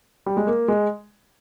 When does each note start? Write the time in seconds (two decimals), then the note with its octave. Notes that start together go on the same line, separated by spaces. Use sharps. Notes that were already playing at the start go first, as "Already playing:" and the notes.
0.26 G3
0.37 G#3
0.47 A#3
0.68 G#3